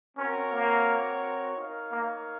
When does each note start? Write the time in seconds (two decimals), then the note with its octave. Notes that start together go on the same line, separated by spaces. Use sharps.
0.17 C4 C#4 F#4 A#4 C#5
0.52 A#3
1.57 D#4 A#4 C#5 F5
1.92 A#3